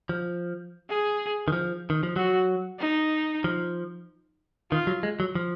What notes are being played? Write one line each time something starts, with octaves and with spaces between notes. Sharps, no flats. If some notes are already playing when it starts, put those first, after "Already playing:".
F3
G#4
D#3
F3
D#3
F3
F#3 F#4
D#4
F3
D#3 F4
F#3
G#3
F#3
F3